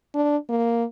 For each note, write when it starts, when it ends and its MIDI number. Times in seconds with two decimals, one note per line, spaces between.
0.14 0.37 62
0.49 0.84 58